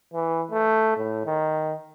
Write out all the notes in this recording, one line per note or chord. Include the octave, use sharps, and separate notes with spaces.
E3
A3
A2
D#3